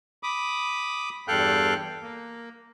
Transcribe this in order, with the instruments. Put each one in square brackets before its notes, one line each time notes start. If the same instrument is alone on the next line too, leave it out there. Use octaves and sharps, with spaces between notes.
[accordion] B5 D6 D#6
E2 G2 A4 F5 G5 F#6
A#3